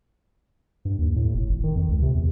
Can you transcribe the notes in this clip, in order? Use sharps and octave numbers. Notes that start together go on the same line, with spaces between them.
G2
D#2
A2
F1
G#1
D#3
F2
C#2
C3
E2